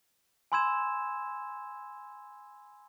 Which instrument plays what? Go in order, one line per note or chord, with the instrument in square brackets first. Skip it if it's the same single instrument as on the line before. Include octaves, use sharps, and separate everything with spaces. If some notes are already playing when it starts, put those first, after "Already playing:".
[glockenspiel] G#5 B5 C6 E6 G#6 E7